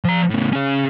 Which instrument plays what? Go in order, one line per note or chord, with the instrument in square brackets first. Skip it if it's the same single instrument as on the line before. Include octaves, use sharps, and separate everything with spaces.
[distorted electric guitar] F3 A#5
A2 C#3
C#4 G#4